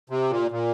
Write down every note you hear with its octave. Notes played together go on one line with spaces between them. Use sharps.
C3
A#2
A#2